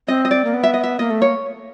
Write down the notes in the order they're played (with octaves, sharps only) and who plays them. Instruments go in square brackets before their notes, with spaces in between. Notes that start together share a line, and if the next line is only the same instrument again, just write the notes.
[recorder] C4 [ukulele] D#5
[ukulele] D#5
D5
[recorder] A#3
B3
[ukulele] E5
D#5
E5
[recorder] A#3 [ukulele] D#5
[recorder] A3
[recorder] A#3 [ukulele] C#5